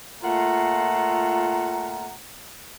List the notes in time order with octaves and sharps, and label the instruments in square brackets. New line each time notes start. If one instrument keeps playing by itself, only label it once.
[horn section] A#2 A3 F4 F#5 A#5